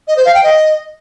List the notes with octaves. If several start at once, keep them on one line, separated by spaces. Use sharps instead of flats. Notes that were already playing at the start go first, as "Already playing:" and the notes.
D#5
C5
F5
G5
D#5